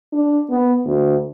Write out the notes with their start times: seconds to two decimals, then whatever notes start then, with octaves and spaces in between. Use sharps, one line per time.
0.12 D4
0.50 B3
0.84 D2